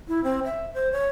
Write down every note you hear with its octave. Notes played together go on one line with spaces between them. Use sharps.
E4
C4
E5
C5
C#5